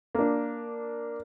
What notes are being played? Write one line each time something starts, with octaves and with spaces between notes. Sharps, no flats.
A#3 D4